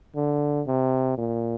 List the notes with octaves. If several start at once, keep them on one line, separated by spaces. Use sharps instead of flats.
D3
C3
A#2